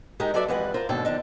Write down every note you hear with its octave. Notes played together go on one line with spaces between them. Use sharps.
G#3 D#4 F#4 G4 A#4
F#3 F#4 A4 B4 D5 E5
F2 E3 G3 G#3 B4 F#5
F4 A#4 C5
D#2 G#2 B2 D3 A4 G5
D3 F3 D4 D#4